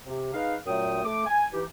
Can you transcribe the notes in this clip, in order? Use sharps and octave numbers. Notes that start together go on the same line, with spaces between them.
C3
G#3 D#4 B4 F5
F#2 A#2 F#3 A3 G5 D#6
A3 D6
G#5
E3 D#4 G4